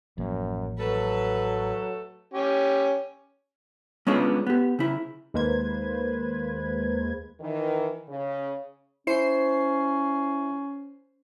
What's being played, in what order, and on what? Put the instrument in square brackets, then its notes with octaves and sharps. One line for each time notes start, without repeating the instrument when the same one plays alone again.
[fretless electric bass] A1 F3 A#3 [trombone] F#2
[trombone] F#3 [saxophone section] A3 F#4 A4 [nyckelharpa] B4
[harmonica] C#4 G4
[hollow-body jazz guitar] G#3 B3 C#4 D4 F4 G#4
B3 G4
C#3 E4
[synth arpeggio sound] D#2 G#3 A#3 B4 C5 G#6
[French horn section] D#3 E3
C#3
[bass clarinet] C#4 [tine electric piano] E4 [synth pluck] C5 C7